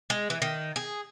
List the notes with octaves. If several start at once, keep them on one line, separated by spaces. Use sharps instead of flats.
G#3
E3
D#3
G#4